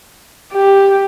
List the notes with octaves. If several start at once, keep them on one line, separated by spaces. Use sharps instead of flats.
G4